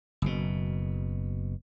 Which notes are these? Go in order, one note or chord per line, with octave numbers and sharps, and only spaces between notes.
F#1 B2